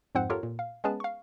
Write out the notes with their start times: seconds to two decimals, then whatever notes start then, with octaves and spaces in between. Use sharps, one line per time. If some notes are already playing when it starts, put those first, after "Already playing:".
0.15 F2 G#2 F3 C4 C5 F#5
0.30 F4 G4 A4 A#4 C#5
0.43 A#2
0.59 F5
0.84 G#3 B3 C#4 G#4 B4 A5
1.00 F5 C#6